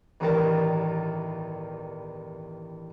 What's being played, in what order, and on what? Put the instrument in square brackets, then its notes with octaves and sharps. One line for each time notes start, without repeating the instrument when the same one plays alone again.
[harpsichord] A1 E2 G2 D#3 A#4 A5